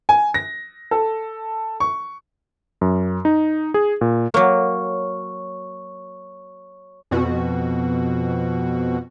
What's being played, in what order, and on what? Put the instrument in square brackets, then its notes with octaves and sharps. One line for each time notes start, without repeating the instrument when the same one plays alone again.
[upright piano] G#5
A#6
A4
C#6
[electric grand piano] F#2
D#4
G#4
A#2
[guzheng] F#3 A#3 [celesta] C#5 C#6
[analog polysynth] F2 B2 F#4